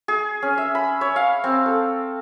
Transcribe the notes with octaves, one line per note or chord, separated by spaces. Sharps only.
G#4
C#4
E5
B5
C#5
F5
C4
A4